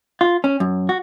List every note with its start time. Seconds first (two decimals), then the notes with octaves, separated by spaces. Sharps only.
0.21 F4
0.44 C#4
0.60 F#2
0.89 F#4